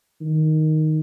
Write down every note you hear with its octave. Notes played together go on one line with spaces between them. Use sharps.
D#3